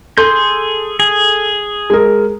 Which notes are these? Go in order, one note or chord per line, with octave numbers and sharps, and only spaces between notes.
G#4 A4 C6 G6
G#4
G#3 A#4